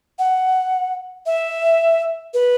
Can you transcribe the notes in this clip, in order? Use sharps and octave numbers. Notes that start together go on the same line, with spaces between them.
F#5
E5
B4